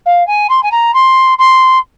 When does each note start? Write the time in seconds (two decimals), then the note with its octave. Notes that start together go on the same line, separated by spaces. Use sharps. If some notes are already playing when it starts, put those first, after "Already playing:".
0.06 F5
0.27 G#5
0.49 C6
0.63 G#5
0.71 A#5
0.94 C6
1.38 C6